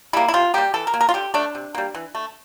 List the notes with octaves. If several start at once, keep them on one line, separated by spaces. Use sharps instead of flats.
G3 A#3 E4
E4
C3 F4
G3 A#3 G4
E3 A4
A#4
A#3
A#4
F4
D3 G4
A3 D4
C3
G3 A#3
E3
A3